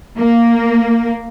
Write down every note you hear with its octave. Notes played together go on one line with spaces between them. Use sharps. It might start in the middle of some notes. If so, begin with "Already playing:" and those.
A#3